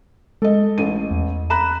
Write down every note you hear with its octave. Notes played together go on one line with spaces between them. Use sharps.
G#3 A4 D#5
A1 D#7
E2
A#5 B5 F#6 E7